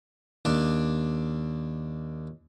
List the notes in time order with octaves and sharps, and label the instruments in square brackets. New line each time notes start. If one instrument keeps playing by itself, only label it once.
[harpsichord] D#2 D4 D5